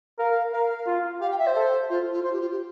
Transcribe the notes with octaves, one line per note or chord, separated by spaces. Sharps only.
A#4 F5
A#4 F5
F4
G4 F5
G5
E5
C5
A4
F4 C5
F4
F4 C5
G4
F4
G4